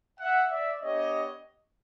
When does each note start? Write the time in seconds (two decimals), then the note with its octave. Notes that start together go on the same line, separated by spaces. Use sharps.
0.20 E5 F#5
0.51 D5 E5
0.81 B3 D4 G4 C#5 D#5